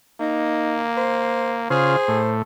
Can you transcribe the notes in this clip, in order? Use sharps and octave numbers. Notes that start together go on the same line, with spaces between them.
A#3 D#4
C5
C#3 F4 G#4 C5
A2